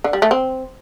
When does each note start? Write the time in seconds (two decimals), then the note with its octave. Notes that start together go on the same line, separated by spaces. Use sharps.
0.04 D3
0.13 G3
0.22 A3
0.31 C4